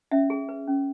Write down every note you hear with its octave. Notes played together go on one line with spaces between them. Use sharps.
C#4 E5
G#4
B4
C#4